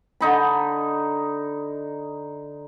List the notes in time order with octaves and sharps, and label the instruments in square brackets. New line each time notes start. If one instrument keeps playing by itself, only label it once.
[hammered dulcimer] D3 D#4 B5